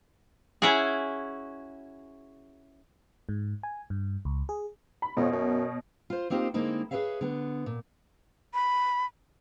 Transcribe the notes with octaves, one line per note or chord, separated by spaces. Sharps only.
C#4 E4 F#4 G#4
G#2
G#5
G2
C#2
G#4
B5
F2 B2 C#5
F#2
F4 C5
A#3 C4 D#4 F4 G4 C5
D3 G#3 A#3 C4 D#4 E4
G#4 A#4 B4 C#5 E5 F5
D3 B3
A#2
B5